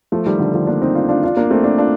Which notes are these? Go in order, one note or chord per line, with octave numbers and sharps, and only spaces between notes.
F3 A3
D#3 G3
D3 F3
D3 F3
A#3 D4
C4 D#4
D4 F4
D4 F4
D4 F4
A#3 D4
A3 C4
A#3 D4
D4 F4